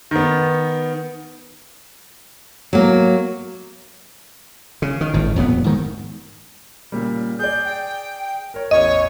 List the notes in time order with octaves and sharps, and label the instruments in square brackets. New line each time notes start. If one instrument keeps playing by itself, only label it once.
[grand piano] D#3 B3
[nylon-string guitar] F#3 A#3
[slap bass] C#3
D#3
G#1 A2
D#1 F2 F#3 B3
G#2 D#3
[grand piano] A#2 C#3 G3
[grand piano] G#4 D5 [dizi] G6
[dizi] G5
[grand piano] A#4 C#5
[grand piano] A1 E2 [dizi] C#5 [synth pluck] D#5